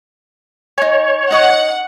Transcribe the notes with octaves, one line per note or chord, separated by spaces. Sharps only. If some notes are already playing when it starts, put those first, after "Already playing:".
D#4 C#5 G#5
D#4 D#5 F#5 C#6